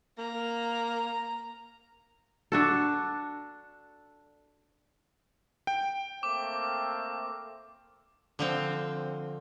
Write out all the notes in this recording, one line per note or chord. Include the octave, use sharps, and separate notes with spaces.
A#3 A#5
D4 F#4 A4
G5
A3 A#3 C4 D6
D3 F3 C4